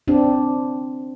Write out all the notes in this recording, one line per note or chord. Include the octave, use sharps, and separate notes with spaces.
C4 D4